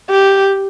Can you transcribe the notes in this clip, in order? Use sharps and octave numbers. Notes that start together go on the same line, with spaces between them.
G4